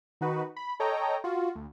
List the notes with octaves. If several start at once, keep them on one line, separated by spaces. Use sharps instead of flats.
D#3 D#4 F#4 B4
B5
A4 C#5 D#5 G5 A#5
F4 F#4
D2